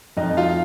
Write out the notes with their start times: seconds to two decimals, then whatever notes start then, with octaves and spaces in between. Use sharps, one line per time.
0.17 F2 D#4 D#5
0.37 F4 F5